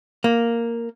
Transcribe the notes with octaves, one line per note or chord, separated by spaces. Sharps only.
A#3